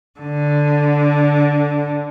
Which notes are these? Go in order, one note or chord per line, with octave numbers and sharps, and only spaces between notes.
D3